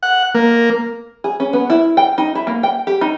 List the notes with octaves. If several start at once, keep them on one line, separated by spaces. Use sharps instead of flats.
F#5
A#3
G#4
C#4
B3
E4
G5
D#4
E4
A#3
G5
G4
D#4